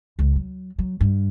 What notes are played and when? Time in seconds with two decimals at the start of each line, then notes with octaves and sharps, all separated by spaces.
0.19 C#2
0.36 F#3
0.78 F#3
1.01 G2